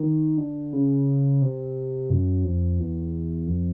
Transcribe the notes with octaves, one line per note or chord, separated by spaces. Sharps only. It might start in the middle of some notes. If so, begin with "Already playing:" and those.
Already playing: D#3
D3
C#3
C3
F#2
F2
E2
F2